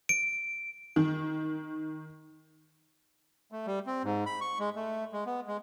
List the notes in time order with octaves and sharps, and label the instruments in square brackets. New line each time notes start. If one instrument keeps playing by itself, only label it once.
[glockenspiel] D7
[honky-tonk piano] D#3
[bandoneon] A3
G3
C4
G#2
B5
C#6
G#3
A3
G#3
B3
G#3